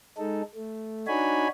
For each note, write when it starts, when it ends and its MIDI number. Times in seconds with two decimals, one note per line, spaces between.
0.18 0.42 56
0.18 0.42 63
0.18 0.42 69
0.55 1.06 57
1.07 1.48 62
1.07 1.48 63
1.07 1.48 66
1.07 1.48 73
1.07 1.48 80
1.07 1.48 83